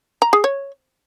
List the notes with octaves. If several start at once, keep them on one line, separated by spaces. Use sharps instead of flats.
A#5
G#4
C#5